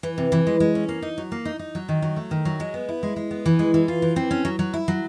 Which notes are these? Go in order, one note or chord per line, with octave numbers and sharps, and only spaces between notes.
E3
C3
E3
G#3
G#3
C#4
A#3
D#4
F#3
A#3
D#4
D#4
F#3
D#3
F#3
A3
D#3
F#3
G#3
B3
E4
G#3
G#3
B3
E3
G#3
E3
F4
E3
C4
C#4
F#3
F#3
E4
F#3